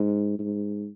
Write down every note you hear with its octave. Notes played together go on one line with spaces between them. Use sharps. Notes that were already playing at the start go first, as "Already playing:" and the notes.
Already playing: G#2
G#2